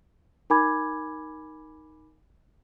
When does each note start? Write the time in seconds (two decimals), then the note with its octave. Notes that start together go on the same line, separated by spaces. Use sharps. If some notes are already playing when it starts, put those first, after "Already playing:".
0.50 D#4 A#4 G#5 B5 D6 G#6